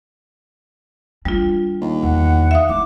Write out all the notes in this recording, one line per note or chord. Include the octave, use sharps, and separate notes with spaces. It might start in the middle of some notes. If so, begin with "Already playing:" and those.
G3 D4 F4
D#2
E2 F#5
E5 F5 D#6
E4 D6